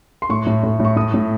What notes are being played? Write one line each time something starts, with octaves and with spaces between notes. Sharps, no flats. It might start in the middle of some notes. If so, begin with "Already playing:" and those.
C6
A2 C#6
A2
A2
A2
C#6
A2 D#6
A2